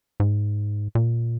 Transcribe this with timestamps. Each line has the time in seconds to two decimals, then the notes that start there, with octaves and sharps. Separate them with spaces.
0.20 G#2
0.95 A#2